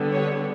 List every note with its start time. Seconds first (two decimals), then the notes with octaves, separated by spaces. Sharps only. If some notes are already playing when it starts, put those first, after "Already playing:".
Already playing: D3 G3 B3
0.13 C#5